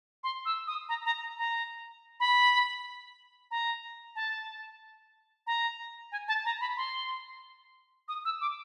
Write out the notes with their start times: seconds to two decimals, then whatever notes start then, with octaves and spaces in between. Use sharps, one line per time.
0.24 C6
0.45 E6
0.67 D#6
0.89 A#5
1.06 A#5
1.38 A#5
2.20 B5
3.51 A#5
4.16 A5
5.47 A#5
6.12 G#5
6.28 A5
6.45 A#5
6.61 B5
6.77 C6
8.08 D#6
8.25 E6
8.41 D6